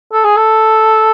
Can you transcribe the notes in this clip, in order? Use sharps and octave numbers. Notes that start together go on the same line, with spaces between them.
A4
G#4
A4